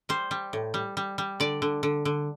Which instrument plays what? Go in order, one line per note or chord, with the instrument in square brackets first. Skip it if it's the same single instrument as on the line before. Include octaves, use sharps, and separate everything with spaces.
[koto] G3 C5
G3
A2
G3
G3
G3
D3 D5
D3
D3
D3